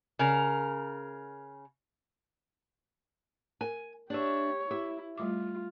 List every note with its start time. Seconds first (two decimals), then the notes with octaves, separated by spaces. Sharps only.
0.19 C#3 A#4
3.61 A#4 G#5
4.10 D4 G4 C#5 E5
4.71 E4 G4 E5
5.18 G3 A3 F4 D6